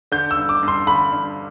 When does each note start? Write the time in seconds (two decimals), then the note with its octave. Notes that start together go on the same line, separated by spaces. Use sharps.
0.12 D3 G6
0.31 E6
0.37 G2
0.49 D6
0.63 G2
0.68 C6
0.87 D3 B5
1.12 G2